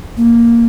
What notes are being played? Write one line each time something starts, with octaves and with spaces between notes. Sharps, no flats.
A#3